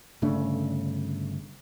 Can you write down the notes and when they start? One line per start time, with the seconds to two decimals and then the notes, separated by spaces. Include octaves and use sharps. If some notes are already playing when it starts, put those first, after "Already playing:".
0.22 G1 C#3 A3 D4